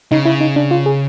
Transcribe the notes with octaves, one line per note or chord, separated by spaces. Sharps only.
C#3 D#4
E4
D#4
D4
F4
G#4